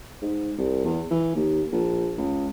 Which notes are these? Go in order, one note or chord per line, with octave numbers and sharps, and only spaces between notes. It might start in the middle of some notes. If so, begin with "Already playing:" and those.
G#2
C2
E2
E3
D#2
A#1
C#2